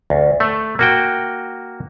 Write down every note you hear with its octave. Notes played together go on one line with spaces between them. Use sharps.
D2
A3
A#3 F#4 G5